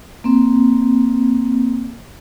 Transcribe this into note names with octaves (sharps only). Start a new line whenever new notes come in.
A#3 C4